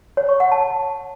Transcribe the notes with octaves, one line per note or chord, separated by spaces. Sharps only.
C#5
C#6
F#5
A5